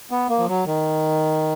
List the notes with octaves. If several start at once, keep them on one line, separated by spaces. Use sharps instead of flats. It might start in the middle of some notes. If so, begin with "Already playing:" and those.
B3
A#3
F3
F#3
D#3